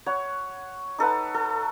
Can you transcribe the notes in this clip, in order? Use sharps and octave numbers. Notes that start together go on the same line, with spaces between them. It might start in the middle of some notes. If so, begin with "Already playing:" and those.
C#5 F#5 B5
D#4 A4 B4 F#5
A4